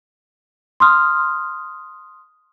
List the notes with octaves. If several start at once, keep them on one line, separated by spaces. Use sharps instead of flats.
C6 D#6 F6